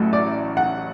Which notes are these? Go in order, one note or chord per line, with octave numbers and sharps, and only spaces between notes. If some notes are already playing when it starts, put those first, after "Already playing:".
Already playing: A1 A2 F#3 A3
D5
F#5